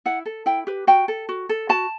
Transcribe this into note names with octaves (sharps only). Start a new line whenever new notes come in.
E4 F#5
A4
E4 G5
G4 B4
F#4 G5
A4
F#4
A4
F#4 A5